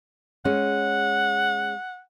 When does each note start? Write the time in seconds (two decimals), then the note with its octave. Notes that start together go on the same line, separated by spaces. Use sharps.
0.45 G#3 C#4 F#5